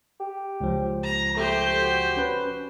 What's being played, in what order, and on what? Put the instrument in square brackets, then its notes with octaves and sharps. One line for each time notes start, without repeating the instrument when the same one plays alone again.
[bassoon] G4
[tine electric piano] C#2 F3
[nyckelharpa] A#5
[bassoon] A3 [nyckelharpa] G4 C5
[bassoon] F#4
[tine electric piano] C#4 B4